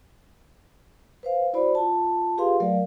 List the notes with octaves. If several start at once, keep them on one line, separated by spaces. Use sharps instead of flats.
B4 C5 F5
E4 F#4 C5 D5 B5
F4 A5
F4 G4 G#4 B4 F5 C6
F#3 A3 A#4 D5 F5